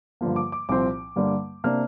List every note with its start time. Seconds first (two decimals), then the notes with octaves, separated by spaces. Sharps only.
0.21 G2 D3 F3 A#3
0.36 D6
0.52 D6
0.69 C2 A#2 F3 C4 D6
1.16 G2 D3 G3 A#3
1.64 C3 A#3 D4 F6